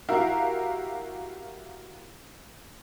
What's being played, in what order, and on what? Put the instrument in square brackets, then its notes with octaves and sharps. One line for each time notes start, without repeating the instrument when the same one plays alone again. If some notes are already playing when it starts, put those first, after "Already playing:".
[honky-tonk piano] E4 F#4 G4 A#4 E5 F5